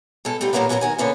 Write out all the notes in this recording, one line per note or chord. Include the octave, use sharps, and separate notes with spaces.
B2 G#3 A4
G3 A3 B3 D#4 F4
A#2 D3 D#3 F#3 A#3 B3
F#2 B2 F#3 G#4 A#4
D#3 F#4 G#5
B2 D3 A#3 B3 C#4